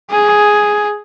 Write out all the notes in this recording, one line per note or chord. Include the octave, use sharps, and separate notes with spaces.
G#4